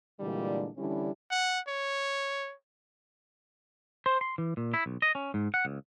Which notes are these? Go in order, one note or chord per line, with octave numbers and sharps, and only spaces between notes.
A#2 D3 E3 G3 G#3 D4
D3 E3 G3 C#4 D4 E4
F#5
C#5
C5
C6
E3
A#2
E4
B1
D#5
C#4
G#2
F#5
C#2